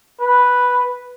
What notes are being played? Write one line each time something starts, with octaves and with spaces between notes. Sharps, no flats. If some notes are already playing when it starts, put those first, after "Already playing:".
B4